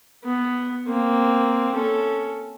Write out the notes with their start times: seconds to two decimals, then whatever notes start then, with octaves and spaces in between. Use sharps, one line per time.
0.24 B3
0.87 A#3 C4
1.75 C#4 A4